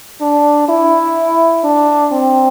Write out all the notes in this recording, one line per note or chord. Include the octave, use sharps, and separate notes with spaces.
D4
E4
D4
C4